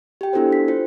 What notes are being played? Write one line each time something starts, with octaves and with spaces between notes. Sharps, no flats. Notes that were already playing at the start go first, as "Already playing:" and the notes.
G4 G5
B3 D4 E4 F#4 A4 C5
B6
F4 C5